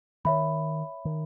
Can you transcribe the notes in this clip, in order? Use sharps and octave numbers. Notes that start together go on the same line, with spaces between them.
D#3 C#5 E5 B5
D#3